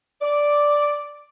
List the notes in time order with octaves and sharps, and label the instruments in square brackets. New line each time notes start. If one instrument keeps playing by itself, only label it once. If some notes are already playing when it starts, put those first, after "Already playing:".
[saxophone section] D5